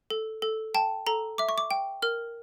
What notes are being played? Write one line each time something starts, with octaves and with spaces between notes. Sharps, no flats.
A4
A4
G5 A5
A4 A#5
E5 D6
C#6
D6
G5
A#4 F6